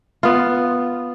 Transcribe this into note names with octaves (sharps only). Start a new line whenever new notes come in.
B3 F4